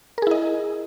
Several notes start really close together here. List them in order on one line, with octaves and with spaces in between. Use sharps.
A#4 G#4 E4 D#5